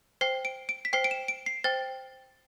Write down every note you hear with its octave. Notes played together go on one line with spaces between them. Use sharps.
C5 G5 C7
D7
D7
B6
C5 G5 C7
D7
E7
D7
C7
C5 G5 A6